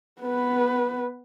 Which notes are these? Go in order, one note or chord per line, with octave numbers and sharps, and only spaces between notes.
B3 B4